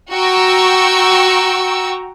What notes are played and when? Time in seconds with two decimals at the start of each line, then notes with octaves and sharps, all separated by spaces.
0.13 F#4 G5 A#5 C#6 E6